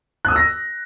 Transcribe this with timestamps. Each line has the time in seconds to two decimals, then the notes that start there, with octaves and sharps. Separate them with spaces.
0.25 F#6
0.28 D#6
0.32 E6
0.36 A#6